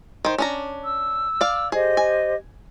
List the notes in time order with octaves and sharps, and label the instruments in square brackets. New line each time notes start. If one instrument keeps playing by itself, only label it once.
[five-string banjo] D#3 C5
C#4 D4 A#5
[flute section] E6
[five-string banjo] D5 F5
[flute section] G4 C5 D#5 [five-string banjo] G#4
[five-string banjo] G#5